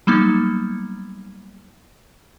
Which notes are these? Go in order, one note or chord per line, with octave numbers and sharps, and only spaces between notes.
F#3 G3 A#3 B3 D#4